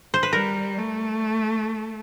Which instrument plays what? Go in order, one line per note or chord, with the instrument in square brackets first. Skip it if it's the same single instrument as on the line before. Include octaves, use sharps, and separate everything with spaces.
[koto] C5
B4
[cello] G3 [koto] A#4
[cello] A3